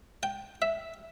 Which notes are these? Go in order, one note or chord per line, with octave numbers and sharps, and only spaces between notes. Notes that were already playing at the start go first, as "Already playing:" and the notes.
G5
E5